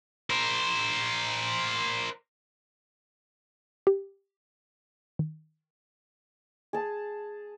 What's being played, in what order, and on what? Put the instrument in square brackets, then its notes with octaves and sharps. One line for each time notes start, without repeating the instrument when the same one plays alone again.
[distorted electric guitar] A#4 C5
[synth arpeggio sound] G4
D#3
[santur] G#4 A5